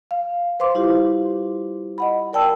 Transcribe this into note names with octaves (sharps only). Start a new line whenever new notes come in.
F5
B4 C5 F5 C6 D6
G3 E4 F4 G4
D#5 F#5 B5
A#4 D5 G5 A5 E6